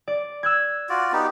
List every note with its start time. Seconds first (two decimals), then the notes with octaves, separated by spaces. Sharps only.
0.08 D5
0.43 E6 F#6 G#6
0.89 F4 F#4 D5
1.13 B3 D#4 G4